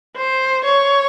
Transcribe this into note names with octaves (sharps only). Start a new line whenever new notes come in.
C5
C#5